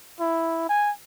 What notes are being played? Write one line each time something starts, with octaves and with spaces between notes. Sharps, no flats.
E4
G#5